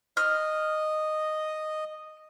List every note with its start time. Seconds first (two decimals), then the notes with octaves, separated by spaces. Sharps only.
0.17 D#5 F6